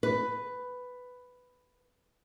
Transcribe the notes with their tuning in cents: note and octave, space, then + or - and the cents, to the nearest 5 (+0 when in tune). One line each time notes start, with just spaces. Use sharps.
B4 +10